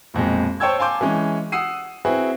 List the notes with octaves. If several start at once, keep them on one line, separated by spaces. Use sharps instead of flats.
B1 F2 A#2 G#3
C5 C#5 G5 A5 E6 G#6
F5 G#5 A5 C6 D6 G6
E3 G#3 C#4
F#5 D#6 E6 C7 D#7
C4 E4 F#4 G#4 B4